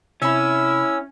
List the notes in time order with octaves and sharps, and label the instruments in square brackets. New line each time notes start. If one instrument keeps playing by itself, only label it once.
[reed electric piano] C3 B5 [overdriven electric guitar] C#4 [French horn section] E4 [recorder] E6